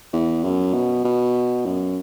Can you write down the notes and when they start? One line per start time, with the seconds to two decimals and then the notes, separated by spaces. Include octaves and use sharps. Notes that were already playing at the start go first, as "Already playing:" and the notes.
0.13 E2
0.44 F#2
0.74 B2
1.04 B2
1.66 F#2